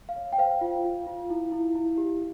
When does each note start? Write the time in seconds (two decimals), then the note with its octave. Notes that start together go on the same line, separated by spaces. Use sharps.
0.09 F5
0.16 C#5
0.32 G5
0.38 C5 F5
0.61 F4
0.84 F4
1.07 F4
1.30 E4
1.52 E4
1.75 E4
1.98 G4